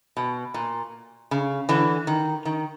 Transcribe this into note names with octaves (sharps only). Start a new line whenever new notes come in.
B2
A#2
C#3
D3 E3
D#3
D#3